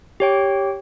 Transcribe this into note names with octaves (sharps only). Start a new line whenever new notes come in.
G4 C#5 G5